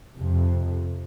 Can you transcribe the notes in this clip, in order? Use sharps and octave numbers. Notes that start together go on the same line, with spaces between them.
F2 C3